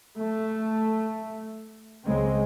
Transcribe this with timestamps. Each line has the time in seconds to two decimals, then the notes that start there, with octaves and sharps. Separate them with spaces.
0.17 A3
2.06 C#2 C#3 G#3 C4